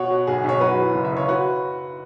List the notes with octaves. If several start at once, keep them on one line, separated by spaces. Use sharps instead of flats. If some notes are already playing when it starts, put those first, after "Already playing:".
Already playing: B2 C#5 F#5
B2
B1 G#4
B1 C#5
F#2 F#4 B4
E3
F#1
E5
C#3 C#5
F#4 B4